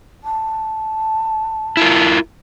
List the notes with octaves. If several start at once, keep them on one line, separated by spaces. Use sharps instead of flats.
A5
E4 F4 A#4